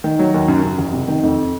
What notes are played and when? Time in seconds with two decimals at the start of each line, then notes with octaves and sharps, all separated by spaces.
0.04 D#3
0.19 F#3
0.34 D#2
0.48 F#2
0.63 C#3
0.78 F#1
0.93 C3
1.08 D#3
1.24 F2